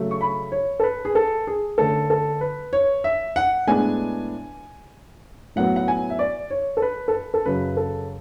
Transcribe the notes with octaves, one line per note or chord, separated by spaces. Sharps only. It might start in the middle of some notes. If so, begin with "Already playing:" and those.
Already playing: C#3 F#3 A3
C#6
B5
C#5
A4
B4
G#4
A4
G#4
D3 A3 C#4 A4
A4
B4
C#5
E5
F#5
A2 G#3 B3 D4 G#5
A2 F#3 B3 F#5
F#5
G#5
E5
D5
C#5
A4
B4
A4
B4
A4
F#2 C#3 F#3 B4
A4